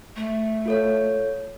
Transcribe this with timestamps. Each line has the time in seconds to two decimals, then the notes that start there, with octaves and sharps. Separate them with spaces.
0.16 A3
0.66 F4 A4 C#5